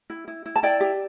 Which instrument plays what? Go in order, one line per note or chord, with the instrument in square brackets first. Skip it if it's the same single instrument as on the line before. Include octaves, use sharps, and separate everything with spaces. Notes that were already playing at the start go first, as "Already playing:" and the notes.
[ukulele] E4
E4
E4
A5
E4 D5 G5
G4